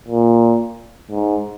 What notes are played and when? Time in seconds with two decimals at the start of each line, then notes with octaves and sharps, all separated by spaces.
0.08 A#2
1.11 G#2